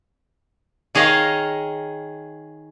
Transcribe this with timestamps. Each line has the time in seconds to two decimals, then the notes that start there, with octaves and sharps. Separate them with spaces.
0.95 D#3 G#4 C#5 D#5 F5